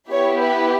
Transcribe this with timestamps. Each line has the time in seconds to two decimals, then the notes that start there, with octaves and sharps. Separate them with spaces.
0.10 B3 E4 G4 C#5
0.42 B4